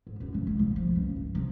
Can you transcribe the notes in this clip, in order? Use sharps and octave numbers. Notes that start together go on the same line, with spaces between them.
G#2
F#2
C2
G#3
A#1
F3
C#2
G2
C3